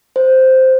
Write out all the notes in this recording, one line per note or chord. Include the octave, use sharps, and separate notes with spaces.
C5